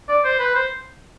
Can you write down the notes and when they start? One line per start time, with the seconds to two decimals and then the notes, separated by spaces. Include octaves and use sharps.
0.08 D5
0.24 C5
0.39 B4
0.55 C5